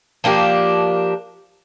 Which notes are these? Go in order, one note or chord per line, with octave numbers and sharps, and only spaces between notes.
F3 A#3 D4 G4